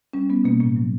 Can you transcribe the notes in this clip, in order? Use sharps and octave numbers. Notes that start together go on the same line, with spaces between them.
G3 C#4
G3 B3
B2 A#3
A2 A#3
F#3